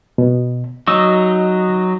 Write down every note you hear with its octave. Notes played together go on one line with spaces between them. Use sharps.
B2
F#3 D#4 D#6 E6